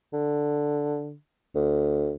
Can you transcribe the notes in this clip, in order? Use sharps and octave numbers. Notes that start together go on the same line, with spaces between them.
D3
D2